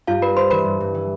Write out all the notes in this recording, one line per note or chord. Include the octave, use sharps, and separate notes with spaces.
G2 F4 F5
D4 B4 B5
D4 C5 C6
E3 B4 B5
G2
G2
E3